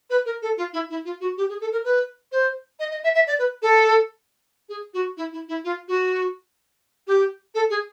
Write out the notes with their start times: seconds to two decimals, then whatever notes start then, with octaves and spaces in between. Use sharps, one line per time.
0.09 B4
0.25 A#4
0.42 A4
0.57 F4
0.73 E4
0.89 E4
1.04 F4
1.20 F#4
1.37 G4
1.48 G#4
1.60 A4
1.72 A#4
1.84 B4
2.31 C5
2.79 D#5
2.91 D#5
3.03 E5
3.14 E5
3.26 D5
3.38 B4
3.62 A4
4.68 G#4
4.93 F#4
5.17 E4
5.32 E4
5.48 E4
5.64 F4
5.88 F#4
7.07 G4
7.54 A4
7.69 G#4